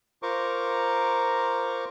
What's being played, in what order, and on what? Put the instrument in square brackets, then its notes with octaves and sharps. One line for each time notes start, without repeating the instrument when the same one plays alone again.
[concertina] F4 A#4 C5 A#5 C#6 D6